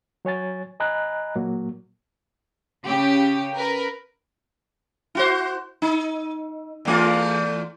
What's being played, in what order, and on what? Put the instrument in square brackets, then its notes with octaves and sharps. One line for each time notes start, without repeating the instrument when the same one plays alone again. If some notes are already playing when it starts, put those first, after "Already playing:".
[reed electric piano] F#3 C#5 G#5 A6
D#5 G#5 A#5 B5 F#6
A#2 F#3 A#3
[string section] C#3 G4
A#4 B4
[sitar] E4 F#4 C5
D#4
E2 A3 F4